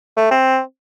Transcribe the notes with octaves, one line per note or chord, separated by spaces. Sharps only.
A3
C4